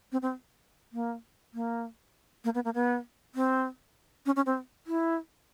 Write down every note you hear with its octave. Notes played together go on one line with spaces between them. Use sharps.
C4
C4
A#3
A#3
A#3
B3
A#3
B3
C4
C#4
C#4
C4
E4